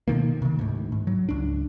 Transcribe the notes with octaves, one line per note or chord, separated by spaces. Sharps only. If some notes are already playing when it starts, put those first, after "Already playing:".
B2 D3 D#3 A#3
C3 D#3
D2 G#2
G#2
F#3
C#2 D4